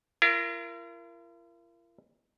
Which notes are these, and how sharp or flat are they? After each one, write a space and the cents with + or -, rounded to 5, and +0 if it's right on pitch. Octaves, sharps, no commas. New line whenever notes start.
F4 -45 A#4 +0